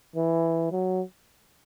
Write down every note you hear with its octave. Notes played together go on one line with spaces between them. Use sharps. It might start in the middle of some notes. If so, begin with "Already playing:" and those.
E3
F#3